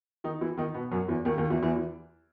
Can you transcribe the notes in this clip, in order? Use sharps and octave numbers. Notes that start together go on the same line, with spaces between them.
D#3 D#4
E3 E4
D#3 D#4
B2 B3
F#2 F#3
E2 E3
D#2 D#3
D#2 D#3
E2 E3
E2 E3
E3